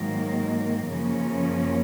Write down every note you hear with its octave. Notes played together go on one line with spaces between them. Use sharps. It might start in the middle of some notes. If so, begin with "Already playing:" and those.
Already playing: G#2 D#3 F#3 A#3
F#2 C#3 F3 A#3 C#4